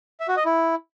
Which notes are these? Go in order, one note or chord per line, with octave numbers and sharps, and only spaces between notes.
E5
F#4
D#5
E4